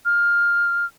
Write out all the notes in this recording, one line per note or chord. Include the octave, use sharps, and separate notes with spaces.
F6